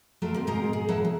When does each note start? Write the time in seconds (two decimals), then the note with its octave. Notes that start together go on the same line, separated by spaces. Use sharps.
0.22 F#3 A3 F4 A#4
0.34 A#3 C4
0.47 G#2 B2 G#3 A#4 C5 A#5
0.73 G#4
0.88 F#3 A#3 E4 A4 F#5 A5
1.05 B2